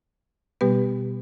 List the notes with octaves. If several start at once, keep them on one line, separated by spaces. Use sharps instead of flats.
B2 G3 B3 G4 B4